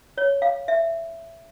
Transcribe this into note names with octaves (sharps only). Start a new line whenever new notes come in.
C#5
F5
E5